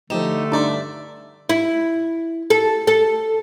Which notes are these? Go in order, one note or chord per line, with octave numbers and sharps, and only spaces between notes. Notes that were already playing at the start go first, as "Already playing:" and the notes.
D3 F3 A3 D#4 G4 E7
G2 D4 D#4 D5 E5 C6
E4
A4
A4